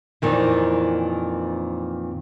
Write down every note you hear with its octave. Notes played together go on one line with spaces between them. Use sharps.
F2 A#2 D#3 E3